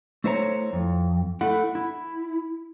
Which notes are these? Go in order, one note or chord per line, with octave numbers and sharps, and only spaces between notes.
A3 E4 C5 C#5 A#5
F2
A3 E4 F#5
E4